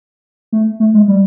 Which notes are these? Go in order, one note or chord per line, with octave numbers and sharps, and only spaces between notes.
A3
A3
G#3
G3